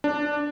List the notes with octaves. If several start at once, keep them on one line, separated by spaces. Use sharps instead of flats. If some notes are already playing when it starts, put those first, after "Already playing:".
D4